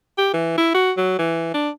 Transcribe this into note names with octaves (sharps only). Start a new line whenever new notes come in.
G4
E3
E4
F#4
F#3
E3
D4